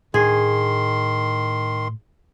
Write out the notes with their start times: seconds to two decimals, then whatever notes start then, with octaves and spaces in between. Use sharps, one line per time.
0.14 A2 D#3 D4 G#4 C6